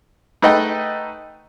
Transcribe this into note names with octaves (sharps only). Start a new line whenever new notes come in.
A3 D#4 B4 D#5 F#5 G5